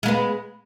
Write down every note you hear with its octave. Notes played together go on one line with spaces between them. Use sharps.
G#3 A#3 B3